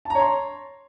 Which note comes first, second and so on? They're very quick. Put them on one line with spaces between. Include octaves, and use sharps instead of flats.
A5 A#5 C#5 C6